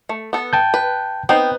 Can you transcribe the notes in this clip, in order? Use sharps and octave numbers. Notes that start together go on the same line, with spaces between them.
A3
B3 A4
G5 A5 G6
B4
B3 C4 D#4 G5